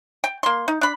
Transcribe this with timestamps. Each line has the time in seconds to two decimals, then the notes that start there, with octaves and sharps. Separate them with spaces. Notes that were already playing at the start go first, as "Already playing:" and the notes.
0.24 G5
0.43 A#3 C6
0.68 D#4
0.81 D4 B5